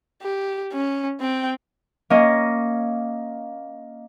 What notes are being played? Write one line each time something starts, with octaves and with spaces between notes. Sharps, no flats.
G4
C#4
C4 G5
A#3 C#4 D#5